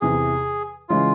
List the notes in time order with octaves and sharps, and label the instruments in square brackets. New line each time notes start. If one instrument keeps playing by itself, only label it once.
[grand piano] E2 C3 E3 [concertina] G#4
[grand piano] C#3 E3 G#3 [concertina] F4